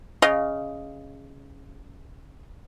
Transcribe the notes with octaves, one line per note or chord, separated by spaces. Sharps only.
C#3 D#5 F5